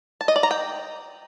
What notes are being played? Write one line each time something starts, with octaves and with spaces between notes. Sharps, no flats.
A5
D#5
D5
A#5
G5